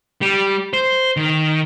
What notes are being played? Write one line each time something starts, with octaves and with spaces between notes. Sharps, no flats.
G3
C5
D#3